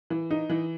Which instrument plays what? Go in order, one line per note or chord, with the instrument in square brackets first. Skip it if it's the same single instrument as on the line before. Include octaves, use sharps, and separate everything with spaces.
[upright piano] E3
D#4
E3